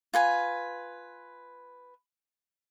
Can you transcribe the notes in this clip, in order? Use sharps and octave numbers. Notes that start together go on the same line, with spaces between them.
F4 B4 G#5